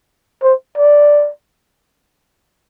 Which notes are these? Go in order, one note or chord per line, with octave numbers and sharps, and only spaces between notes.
C5
D5